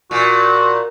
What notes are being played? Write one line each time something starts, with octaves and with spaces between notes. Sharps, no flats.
A#2 F#4